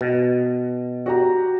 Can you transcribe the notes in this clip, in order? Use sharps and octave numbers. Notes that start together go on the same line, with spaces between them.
B2
F#4 G4 A#5